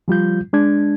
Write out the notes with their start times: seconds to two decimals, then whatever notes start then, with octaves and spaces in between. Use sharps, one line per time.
0.08 F3 G3 F4 G6
0.53 G#3 D4 G#6